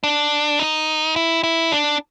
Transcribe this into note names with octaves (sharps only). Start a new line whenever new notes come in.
D4
D#4
E4
E4
D4